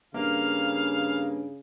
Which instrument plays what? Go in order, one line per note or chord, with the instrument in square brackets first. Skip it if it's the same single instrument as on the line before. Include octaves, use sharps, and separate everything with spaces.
[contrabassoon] G2 [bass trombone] C#3 [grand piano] A#3 [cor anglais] F5